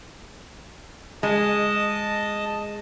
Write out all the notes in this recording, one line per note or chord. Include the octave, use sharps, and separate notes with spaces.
G#3 D#5 A5